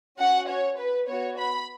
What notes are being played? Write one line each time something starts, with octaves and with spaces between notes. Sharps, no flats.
C#4 F#4 F#5
C#5
B4
B3 F#4 C#5
B5